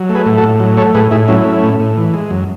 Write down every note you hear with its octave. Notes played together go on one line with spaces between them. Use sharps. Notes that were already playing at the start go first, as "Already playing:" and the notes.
Already playing: F#3
A3
G#4 B4
A2
F#4 A4
A2
F#3
A3 A4 C#5
A2 G#4 B4
A2 E4 G#4
F#3 C#4 E4
A3
A2
A2
E3
G#3
F#2